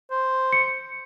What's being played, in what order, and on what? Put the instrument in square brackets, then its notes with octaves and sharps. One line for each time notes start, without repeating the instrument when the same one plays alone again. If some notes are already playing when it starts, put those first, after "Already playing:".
[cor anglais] C5
[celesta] C#7